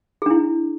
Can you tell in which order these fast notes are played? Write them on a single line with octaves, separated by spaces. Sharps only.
G#4 D4 E4